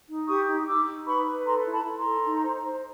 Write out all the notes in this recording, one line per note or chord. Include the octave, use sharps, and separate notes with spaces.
D#4
G4 C#6 D#6
D#4
D#4 D6 E6
D#4
B4 B5 C#6
B4
A4 A#5 C6
E4
A5 B5
E4
A#5 C6
A4
D#4
C5
C5